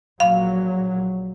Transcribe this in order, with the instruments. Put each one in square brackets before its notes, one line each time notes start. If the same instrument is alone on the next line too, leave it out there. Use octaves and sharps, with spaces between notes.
[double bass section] A#1 A#2 F#3 [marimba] F5